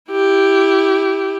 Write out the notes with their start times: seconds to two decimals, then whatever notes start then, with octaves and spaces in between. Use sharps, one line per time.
0.11 E4 G4